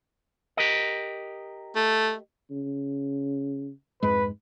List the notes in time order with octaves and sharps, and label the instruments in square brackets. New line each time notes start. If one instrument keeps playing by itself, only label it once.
[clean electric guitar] G4 A#4 D#5
[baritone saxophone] A3
[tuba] C#3
[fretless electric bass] F2 G#2 G#3 [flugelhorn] B4